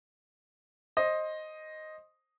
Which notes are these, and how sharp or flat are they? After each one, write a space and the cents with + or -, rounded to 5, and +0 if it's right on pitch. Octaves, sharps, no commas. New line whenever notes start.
C5 +15 D#5 +0